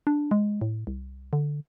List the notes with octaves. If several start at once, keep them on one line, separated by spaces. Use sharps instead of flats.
D4
G#3
A2
C2
D3